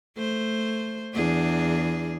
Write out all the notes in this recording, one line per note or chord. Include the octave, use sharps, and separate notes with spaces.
A3 C5
E2 D4 G#4